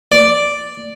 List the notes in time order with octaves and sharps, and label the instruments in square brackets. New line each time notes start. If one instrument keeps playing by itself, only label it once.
[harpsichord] D5